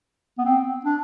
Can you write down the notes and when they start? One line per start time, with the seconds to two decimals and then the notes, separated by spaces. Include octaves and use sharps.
0.38 B3
0.45 C4
0.85 D4